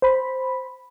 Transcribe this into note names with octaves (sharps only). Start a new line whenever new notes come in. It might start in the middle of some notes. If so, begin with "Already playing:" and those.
C5 B5